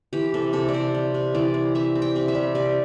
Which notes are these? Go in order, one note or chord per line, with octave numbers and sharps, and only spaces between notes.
E3 G4
C3 A4
C3 A4
D5
C3 C5
G3
C3
E3 D5
C4
G3 E5
C4
G5
C3
E5
G3
C3 D5